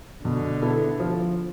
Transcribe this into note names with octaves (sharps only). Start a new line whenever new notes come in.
B2 D3
B3 E4 A4
F3